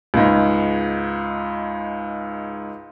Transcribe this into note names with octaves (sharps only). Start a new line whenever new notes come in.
C#2 G#2